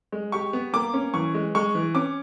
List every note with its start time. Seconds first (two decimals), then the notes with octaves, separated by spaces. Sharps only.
0.12 G#3
0.32 G4 C#6
0.53 B3
0.73 A#3 D6
0.94 C#4
1.14 E3 C#6
1.34 G#3
1.55 G#3 C#6
1.75 E3
1.95 C#4 D6